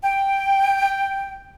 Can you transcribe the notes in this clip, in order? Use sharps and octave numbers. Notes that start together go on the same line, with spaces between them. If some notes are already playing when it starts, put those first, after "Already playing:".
G5